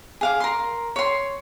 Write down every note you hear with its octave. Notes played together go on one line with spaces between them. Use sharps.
G#4 F5 D6
A#4 C6
C#5 C6